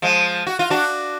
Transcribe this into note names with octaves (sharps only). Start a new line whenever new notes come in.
F3 G#3
F#4
F4
D4 F#4